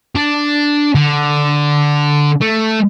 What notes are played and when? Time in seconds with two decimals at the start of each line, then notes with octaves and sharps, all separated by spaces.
0.15 D4
0.95 D3
2.41 A3